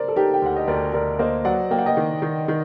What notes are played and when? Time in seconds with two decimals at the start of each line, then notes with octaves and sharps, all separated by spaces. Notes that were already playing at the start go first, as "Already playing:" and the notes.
Already playing: A#4 C5 D5
0.08 A4
0.16 D#4 G4 A#4
0.34 G5
0.42 D2 F#5
0.56 D#5
0.68 D2 A#4 D5
0.93 D2 A#4 D5
1.19 A#3 C5 D#5
1.45 F#3 D5 F#5
1.71 A#3 G5
1.78 F#5
1.86 D#5 G5
1.97 D#3
2.22 D#3
2.48 D#3